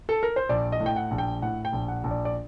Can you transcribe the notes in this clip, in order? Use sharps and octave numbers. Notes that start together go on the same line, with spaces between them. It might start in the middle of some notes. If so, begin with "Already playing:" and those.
A4
A#4
C5
A#1 D5
D#5
A2
G5
F#5
A#1
G5
A2 F#5
G5
A#1
F#5
A#1
D5
D5